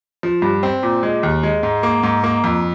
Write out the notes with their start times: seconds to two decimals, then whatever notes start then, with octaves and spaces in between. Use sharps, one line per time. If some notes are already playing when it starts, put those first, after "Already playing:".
0.23 F3
0.42 G2
0.63 C4
0.83 A#2
1.03 G#3
1.23 D#2
1.43 G#3
1.63 G#2
1.83 A#3
2.03 G#2
2.24 A#3
2.44 F2